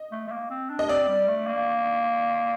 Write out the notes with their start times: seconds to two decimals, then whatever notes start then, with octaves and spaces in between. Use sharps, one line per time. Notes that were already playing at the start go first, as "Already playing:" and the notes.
Already playing: D#5
0.12 A3
0.28 A3
0.32 A#3
0.51 C4
0.70 D4
0.79 D#5
0.89 C4 D5
1.08 G3
1.28 A3
1.47 A#3